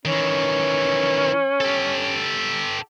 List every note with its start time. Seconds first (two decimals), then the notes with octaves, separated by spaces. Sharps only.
0.05 D#3 E3 C#4
1.61 G4 A4